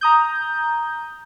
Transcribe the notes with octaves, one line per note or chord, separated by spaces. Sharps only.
A#5 D#6 G6